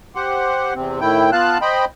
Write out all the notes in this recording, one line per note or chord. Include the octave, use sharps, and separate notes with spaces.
G4 C5 F#5
E2 C3 C4
A2 D#3 E4 G5
B3 F4 F5 A5 F#6
C5 D#5 G5 B5